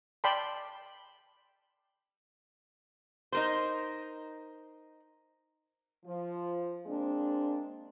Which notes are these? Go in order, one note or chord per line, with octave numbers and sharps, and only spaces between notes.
D5 G5 A5 B5 C6
D#4 A#4 C5
F3
G#3 A#3 C4 D4